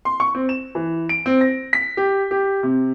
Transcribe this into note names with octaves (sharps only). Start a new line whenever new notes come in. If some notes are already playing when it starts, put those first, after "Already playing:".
C6
C#6
C4
E7
E3
D7
C4
A#6
B6
G4
G4
C3